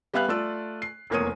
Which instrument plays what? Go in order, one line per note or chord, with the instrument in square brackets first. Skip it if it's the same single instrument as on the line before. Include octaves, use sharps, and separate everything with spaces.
[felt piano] G3 B3 E5 F5 F#6
A3 F4 D5 E6
C7
F1 E2 A#3 C#5 D#6 D#7